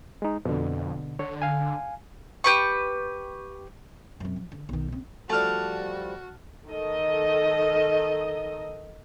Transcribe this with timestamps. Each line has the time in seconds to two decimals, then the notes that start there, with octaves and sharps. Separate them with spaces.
0.22 G#3 D#4
0.45 F2 B2 D3
1.19 D3 C#5
1.42 F5 G#5
2.44 G4 B4 C#6
4.20 F#2 C3
4.36 F3
4.52 D3
4.69 B1 D#3
4.88 C#3 C4
5.30 F3 G3 A3 D4 F#4 A5 F6
6.69 D#3 A4 D#5